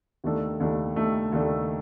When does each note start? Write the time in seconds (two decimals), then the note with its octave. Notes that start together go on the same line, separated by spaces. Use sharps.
0.24 D#2 D#3 A3 D4 A4
0.60 D#2 D#3 A3 D4 A4
0.95 D#2 D#3 A3 D4 A4
1.32 D#2 D#3 A3 D4 A4